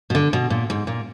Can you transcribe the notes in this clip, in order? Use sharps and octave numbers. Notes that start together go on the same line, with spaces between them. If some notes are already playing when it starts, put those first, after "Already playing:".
B2
D3
B2
A#2
G#2
A#2